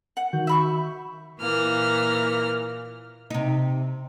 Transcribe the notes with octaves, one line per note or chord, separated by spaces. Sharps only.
F#5
D#3 F#4 G6
E5 B5 C#6
A#2 E3 A#3 F6
C3 D#4